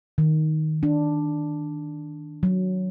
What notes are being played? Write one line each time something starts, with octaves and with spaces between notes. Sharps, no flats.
D#3
D4
F#3